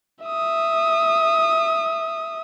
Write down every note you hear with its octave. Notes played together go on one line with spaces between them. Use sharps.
E5 D#6